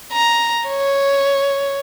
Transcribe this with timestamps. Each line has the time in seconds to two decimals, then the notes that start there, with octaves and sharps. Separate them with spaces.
0.13 A#5
0.68 C#5